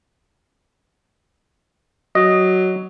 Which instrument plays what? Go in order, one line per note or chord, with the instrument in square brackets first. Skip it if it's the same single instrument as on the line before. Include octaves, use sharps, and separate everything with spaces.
[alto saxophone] F#3 [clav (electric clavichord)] D#5